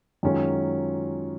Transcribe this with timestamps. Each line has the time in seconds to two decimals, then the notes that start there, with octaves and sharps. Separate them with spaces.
0.23 F#2 D#3 G#3 C#4 F4